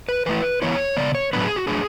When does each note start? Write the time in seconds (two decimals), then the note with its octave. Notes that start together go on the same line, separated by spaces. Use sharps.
0.09 B4
0.26 E3 A3 E4 B4
0.62 E3 B3 E4 C#5
0.97 C#3 E3 B3 D5
1.15 C#5
1.33 A2 F#3 B3 D4 B4
1.44 G#4
1.56 F#4
1.67 F#3 A3 D4 G#4